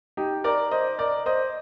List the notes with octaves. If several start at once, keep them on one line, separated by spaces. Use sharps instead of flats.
D#4 G4
A#4 D5
C5 D#5
A#4 D5
C5 D#5